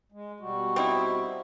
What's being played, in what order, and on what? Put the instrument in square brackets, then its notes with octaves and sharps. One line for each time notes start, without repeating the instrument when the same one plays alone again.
[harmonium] G#3
B2 G3 F#4
[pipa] C4 D#4 E4